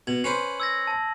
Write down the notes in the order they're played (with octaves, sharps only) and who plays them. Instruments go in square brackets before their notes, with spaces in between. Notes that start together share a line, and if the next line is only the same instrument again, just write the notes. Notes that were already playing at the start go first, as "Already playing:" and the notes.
[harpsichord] B2 [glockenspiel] G#6 F#7
[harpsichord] C#4 B4 C5
[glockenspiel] E6 G#6 A#6
A5